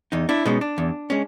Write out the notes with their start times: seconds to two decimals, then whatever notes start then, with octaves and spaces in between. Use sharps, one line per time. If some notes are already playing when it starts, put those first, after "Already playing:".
0.12 E2 D#4
0.29 D4 E4
0.46 B2 G#3 C#4 D#4
0.61 D4
0.78 E2
1.10 G#3 C#4